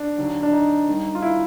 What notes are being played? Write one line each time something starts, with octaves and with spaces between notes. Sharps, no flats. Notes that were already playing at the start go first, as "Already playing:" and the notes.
Already playing: D4
D#2 D3 F#3
D4
D#4
D#2 D#3 G3
F4
E4